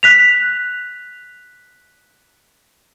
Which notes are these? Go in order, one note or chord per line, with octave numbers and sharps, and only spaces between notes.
F#6 B6 F7